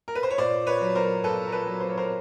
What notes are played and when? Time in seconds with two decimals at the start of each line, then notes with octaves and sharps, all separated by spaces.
0.08 A#4
0.15 B4
0.23 C5
0.31 C#5
0.38 A#2 C5 D5
0.67 B4 C#5
0.81 F#3
0.95 A#4 C5
1.24 A#2 A4 B4
1.47 A#4
1.52 A4 B4
1.66 F#3
1.80 C5
1.89 C#5
1.98 A#4 C5